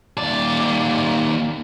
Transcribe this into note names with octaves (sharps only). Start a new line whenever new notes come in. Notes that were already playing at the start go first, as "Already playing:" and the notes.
D#2 D5